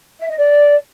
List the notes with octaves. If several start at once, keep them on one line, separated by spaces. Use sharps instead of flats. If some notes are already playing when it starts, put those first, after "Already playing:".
E5
D#5
D5